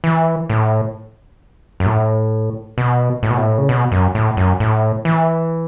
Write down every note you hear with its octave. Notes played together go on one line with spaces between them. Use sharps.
E3
A2
F#2
A2
B2
A2
B2
A2
C#3
B2
F#2
A2
F#2
A2
E3